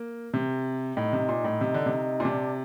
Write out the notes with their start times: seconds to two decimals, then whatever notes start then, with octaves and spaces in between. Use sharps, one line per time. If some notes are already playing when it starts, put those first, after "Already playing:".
Already playing: A#3
0.34 C3
0.97 A2 D#4
1.13 C3
1.29 A#2
1.44 A2
1.61 C3
1.74 D3
1.86 C3
2.20 A#2
2.24 C3 D4